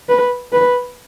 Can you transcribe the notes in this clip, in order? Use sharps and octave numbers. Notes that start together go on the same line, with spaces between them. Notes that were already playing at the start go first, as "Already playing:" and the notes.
B4
B4